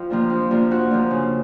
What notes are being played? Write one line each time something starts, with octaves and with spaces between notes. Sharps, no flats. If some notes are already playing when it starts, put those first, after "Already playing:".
Already playing: F2 F4
C3 F3 A#3 D4
F2
C3 F3 A#3 D4
F2 F#4
C3 F3 A#3 D4
C#3